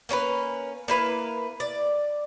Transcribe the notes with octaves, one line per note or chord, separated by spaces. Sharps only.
A#3 C#4 F#4 B4
A#3 E4 B4 F5
D5